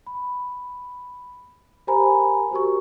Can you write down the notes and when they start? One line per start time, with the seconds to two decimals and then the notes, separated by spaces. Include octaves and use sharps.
0.07 B5
1.87 G4 A#4 C5 G#5 A#5 B5
2.51 F#4 G4 A#4 C#6